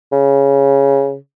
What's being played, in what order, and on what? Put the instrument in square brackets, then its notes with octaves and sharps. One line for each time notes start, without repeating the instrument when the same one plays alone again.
[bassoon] C#3